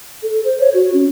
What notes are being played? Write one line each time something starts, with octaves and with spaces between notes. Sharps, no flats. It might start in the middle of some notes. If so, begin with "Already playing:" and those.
A4
C5
C#5
F#4
C#4